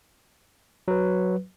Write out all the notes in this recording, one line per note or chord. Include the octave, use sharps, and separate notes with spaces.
F#3 B4